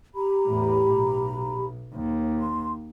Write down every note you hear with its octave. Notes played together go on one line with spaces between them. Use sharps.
G4 A#5 B5
E2 A2
B1
D#2
C6